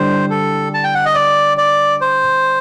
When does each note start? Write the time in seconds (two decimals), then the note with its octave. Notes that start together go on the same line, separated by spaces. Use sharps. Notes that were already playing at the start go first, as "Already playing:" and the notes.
Already playing: D3 G3 D4 C5
0.30 A4
0.74 A5
0.84 G5
0.94 F#5
1.06 D#5
1.15 D5
1.58 D5
2.01 C5